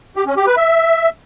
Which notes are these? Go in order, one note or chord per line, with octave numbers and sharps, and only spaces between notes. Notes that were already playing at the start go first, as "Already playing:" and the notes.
G4
C#4
G4
B4
E5